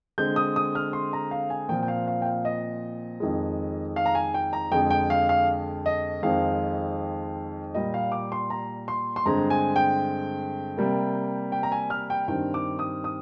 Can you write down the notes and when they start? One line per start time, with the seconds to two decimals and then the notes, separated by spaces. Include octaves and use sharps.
0.18 D3 G#3 C4 G6
0.36 D#6
0.56 D#6
0.75 F6
0.93 C6
1.13 A#5
1.31 F5
1.50 G#5
1.69 A#2 F3 C4 G5
1.83 G5
1.88 F5
2.08 F5
2.22 G5
2.25 F5
2.45 D#5
3.20 F2 D#3 G#3
3.96 F5
4.06 A#5
4.15 G#5
4.34 G5
4.53 A#5
4.72 F2 D3 G#3 G5
4.91 G5
5.10 F5
5.29 F5
5.86 D#5
6.23 F2 D#3 G#3 C4 F5
7.74 A#2 G3 A#3 D#5
7.94 F5
8.12 D6
8.32 C6
8.50 A#5
8.88 C6
9.16 C6
9.26 G2 D3 G#3 C4 A#5
9.50 G#5
9.76 G5
10.77 C3 G3 A#3
11.52 G5
11.63 A#5
11.72 G#5
11.90 F6
12.10 G5
12.28 G2 D#3 G3 C4 G5
12.54 D6
12.79 D#6
13.04 D#6